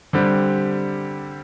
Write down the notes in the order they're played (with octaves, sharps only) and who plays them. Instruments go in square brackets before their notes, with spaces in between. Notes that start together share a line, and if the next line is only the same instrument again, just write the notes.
[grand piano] D3 G3 C4 G4